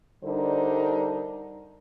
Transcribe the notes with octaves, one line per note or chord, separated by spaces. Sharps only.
D3 G3 D4 D#4 A#4 C5